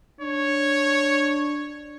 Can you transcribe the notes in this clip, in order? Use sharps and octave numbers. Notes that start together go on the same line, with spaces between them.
D4 C#5